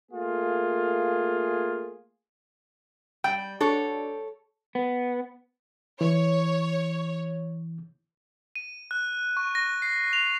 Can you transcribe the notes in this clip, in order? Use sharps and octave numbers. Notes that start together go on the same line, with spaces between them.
A3 A#3 F4 G#4
G3 G5
D4 F#4 A4 C#5
B3
E3 C#5
D#7
F#6
C#6
A#6
C7
F7